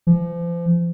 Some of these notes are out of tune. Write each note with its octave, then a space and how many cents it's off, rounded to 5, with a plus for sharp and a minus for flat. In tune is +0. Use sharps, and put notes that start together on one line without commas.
F3 -35